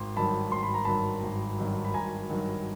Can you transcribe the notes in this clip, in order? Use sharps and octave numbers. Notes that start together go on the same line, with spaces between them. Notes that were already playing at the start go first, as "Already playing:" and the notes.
Already playing: G#1 C6
G2 D#3 F#3 A5 B5
G#1 C6
B5
A#5
G2 D#3 F#3 A5 B5
G#1
G2 D#3 F#3
B5
G#1 G#5 A#5
G2 D#3 F#3